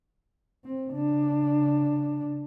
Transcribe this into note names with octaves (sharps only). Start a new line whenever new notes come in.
C4
C#3 D4